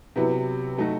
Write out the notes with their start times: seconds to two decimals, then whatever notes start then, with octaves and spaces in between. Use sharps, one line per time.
0.16 C3 F#3 B3 E4
0.77 F#3 A3 D#4 F#4